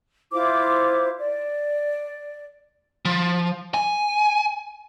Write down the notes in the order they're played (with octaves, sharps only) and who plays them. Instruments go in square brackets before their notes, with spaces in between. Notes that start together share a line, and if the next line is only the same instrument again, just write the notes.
[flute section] E4 F4 C5 D6
D5
[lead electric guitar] F3
G#5